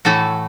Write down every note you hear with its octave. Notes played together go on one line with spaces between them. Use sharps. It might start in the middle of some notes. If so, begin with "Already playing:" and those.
A2 E3 A3 F#4 A4